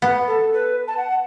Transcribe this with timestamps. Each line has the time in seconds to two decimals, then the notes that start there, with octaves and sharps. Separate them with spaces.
0.02 B3
0.27 A4
0.53 B4
0.88 A5
0.97 F#5